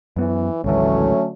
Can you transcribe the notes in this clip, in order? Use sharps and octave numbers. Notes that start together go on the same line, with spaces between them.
F#2 E3 B3
G#1 C#2 D3 E3 F#3 A3 C#4